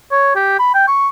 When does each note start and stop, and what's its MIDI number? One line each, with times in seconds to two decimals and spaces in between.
0.12 0.34 73
0.35 0.58 67
0.59 0.73 83
0.74 0.87 79
0.88 1.09 85